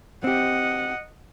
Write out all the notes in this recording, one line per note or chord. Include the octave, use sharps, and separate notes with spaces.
C4 G4 D#5 F#5